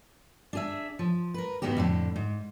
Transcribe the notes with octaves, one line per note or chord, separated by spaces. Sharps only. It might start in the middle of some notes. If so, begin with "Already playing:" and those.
D4 G#4 E5
F3
A#4 B4
G#2 D#3 B3 F#4 G4
F2 A2 D3
G#2